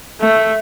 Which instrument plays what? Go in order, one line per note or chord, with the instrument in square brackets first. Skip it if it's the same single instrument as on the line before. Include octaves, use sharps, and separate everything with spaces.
[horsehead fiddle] A3